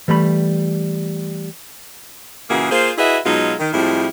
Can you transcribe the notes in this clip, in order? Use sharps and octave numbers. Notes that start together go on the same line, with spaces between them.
E3 G3 A3 B5
A#2 C#3 E3 A#3 F#4 G#4
A#3 F4 G#4 C5
E4 F#4 G#4 B4 D#5 E5
B2 F#3 G#3 D#4 F4
D#3
A2 F3 G3 G#3 C4 E4